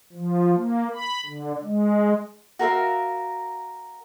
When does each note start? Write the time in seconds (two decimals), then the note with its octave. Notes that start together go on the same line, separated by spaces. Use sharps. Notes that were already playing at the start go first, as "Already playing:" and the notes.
0.13 F3
0.56 A#3
0.93 B5
1.26 D3
1.64 G#3
2.59 F#4 A#4 E5 F5